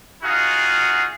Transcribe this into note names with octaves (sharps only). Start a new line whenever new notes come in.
D#4 F4 F#4 G#4 F5 F#5